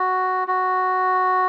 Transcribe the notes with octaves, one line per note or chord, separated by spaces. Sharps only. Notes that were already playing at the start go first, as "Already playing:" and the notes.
Already playing: F#4
F#4